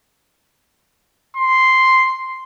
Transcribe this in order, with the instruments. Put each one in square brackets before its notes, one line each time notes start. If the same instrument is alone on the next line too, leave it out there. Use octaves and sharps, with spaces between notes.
[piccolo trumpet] C6